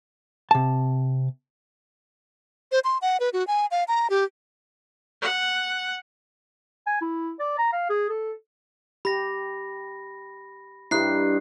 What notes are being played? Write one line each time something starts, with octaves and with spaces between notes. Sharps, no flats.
C3 A5
C5
C6
F#5
B4
F#4
G#5
F5
A#5
G4
F#5
G#5
E4
D5
A#5
F5
G#4
A4
G4 B5 A#6
G2 D#4 E4 G4 F#6 C7